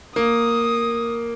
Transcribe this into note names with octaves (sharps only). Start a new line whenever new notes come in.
A#3 D#6